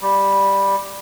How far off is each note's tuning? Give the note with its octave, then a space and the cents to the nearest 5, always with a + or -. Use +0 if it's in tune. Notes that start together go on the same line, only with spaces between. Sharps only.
G3 +5